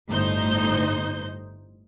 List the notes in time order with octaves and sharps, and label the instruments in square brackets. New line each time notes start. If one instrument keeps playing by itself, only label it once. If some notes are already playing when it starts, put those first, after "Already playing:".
[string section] G1 A2 D#4 C5 G6